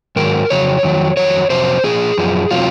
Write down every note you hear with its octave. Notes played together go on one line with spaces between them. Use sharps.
G#2 D#3 F#3 A#4
F2 C#3 F#3 C#5
F2 D#3 F#3
F2 D#3 F#3 C#5
F2 C3 F#3 C5
A#2 F3 G#4
F#2 F3
C3 F#3 F4